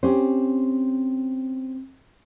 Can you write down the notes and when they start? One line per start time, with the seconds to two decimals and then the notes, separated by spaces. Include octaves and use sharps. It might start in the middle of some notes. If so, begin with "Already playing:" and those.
0.03 C4 C#4 G4 C5